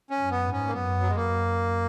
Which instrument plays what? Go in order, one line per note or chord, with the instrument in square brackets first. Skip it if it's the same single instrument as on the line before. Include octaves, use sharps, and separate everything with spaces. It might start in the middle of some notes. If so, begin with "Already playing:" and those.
[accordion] C#4
[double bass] F#2
[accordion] B3
[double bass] G#2
[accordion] C#4
A#3
[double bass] F#2 [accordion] B3
[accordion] F#3
G#3
[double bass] F#2 [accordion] A#3